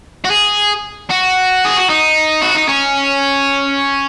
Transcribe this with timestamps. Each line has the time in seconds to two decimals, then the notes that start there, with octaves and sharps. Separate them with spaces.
0.25 F#4
0.30 G#4
1.10 F#4
1.65 G#4
1.76 F#4
1.89 D#4
2.42 F#4
2.55 D#4
2.69 C#4